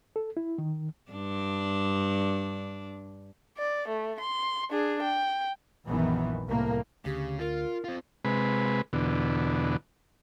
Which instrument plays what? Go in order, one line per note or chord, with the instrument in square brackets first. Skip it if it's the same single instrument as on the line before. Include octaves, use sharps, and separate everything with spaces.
[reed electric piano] A4
E4
D#3
[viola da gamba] G2 D4
[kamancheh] D5
A3
C6
D4 G#4
G5
[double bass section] A#1 F#2 A#2 D#3 E3 B3
C2 A2 A#3
[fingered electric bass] D2 [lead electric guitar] C#3 [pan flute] G4
[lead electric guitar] F4 [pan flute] A#4
[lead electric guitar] C4 F4
[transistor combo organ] C3 G#3 B4
E2 B2 D3